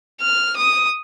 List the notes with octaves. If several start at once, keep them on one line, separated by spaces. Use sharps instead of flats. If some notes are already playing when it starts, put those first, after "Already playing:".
F6
D#6